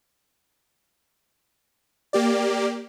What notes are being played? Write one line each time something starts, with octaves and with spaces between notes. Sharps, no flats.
A#3 G4 D5